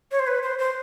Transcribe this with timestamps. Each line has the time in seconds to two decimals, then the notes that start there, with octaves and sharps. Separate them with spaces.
0.12 C#5
0.19 C5
0.27 B4
0.43 C5
0.59 C5